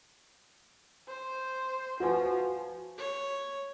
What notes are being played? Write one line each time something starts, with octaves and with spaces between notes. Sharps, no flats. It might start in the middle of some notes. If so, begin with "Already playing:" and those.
C5
F3 F#4 B4 G#5
C#5